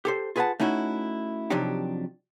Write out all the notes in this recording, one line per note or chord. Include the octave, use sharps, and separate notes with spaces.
G4 A4 C5
F4 G#4 B4 C#5 F#5 A5
A3 C#4 D#4 E4 F#4
C3 F3 F#3 D4 D#4 G4